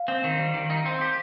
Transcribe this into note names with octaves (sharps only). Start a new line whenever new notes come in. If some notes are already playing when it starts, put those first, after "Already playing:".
Already playing: F5
C4
D#3
G3
D#3
D#4
C4
G4